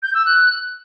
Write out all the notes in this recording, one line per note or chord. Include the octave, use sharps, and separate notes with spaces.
G6
E6
F#6